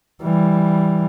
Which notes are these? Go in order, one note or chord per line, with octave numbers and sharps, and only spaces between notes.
E3 G3